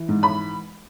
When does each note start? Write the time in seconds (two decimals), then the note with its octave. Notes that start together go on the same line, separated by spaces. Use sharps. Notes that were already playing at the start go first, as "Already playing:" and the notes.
Already playing: E3
0.08 G#2
0.23 B5